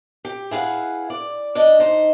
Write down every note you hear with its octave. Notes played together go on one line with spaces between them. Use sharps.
G4
E4 G#4 B4 F5 F#5
D5
D4 D5 D#5
D#4 C5